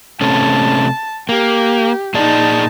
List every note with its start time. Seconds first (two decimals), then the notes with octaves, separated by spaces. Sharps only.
0.21 C3 A3 C#4 A5
1.29 A#3 G4
2.14 A#2 D#4 G#4 D5 A5